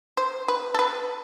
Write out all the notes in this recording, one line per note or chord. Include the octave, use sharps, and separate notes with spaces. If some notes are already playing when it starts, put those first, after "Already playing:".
C5
B4
A4
B4